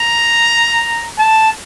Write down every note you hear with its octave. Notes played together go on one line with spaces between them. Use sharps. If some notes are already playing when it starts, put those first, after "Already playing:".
Already playing: A#5
A5